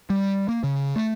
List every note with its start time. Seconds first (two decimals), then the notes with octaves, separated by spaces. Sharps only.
0.10 G3
0.48 A#3
0.64 C#3
0.96 A3